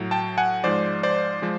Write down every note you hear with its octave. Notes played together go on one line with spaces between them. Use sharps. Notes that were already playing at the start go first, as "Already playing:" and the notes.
Already playing: A2 F#3
G5 A5
F#5 G#5
G#2 F3 G#3 C5 D5
C5 D5
F3 G#3